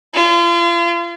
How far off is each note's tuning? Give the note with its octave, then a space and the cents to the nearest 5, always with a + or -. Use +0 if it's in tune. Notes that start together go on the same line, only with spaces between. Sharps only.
F4 -35